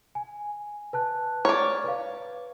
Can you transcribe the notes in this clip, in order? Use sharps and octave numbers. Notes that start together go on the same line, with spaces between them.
G#5
B4 A5 F#6
C#5 D5 F6
B4 F5